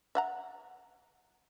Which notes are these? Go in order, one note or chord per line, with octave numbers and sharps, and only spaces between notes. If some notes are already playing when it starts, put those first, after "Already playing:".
E5 F#5 A#5